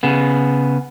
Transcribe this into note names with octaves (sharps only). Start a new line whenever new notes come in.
C#3 B3